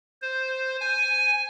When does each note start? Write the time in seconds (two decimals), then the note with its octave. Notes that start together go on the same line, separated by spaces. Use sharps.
0.22 C5
0.81 G#5